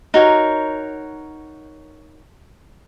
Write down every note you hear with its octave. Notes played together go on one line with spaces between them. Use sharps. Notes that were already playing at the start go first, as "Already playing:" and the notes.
D#4 F#4 A#4 C#5